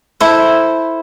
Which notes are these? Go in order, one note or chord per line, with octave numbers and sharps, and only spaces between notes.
E4 A4 C5